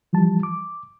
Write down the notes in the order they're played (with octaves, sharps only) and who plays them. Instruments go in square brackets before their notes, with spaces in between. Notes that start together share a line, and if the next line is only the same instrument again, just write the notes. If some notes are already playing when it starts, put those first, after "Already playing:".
[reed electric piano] E3 F3 G3 A5
D6